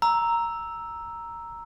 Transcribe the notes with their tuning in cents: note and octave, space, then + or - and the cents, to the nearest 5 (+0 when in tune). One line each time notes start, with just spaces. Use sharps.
A#5 +0 E6 +0